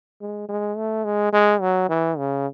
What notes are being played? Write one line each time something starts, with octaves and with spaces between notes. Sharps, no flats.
G#3
G#3
A3
G#3
G#3
F#3
E3
C#3